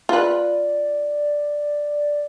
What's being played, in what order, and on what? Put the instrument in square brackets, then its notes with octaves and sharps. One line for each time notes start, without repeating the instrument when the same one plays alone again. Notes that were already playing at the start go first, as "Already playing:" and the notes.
[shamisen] F4 B4 [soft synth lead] D5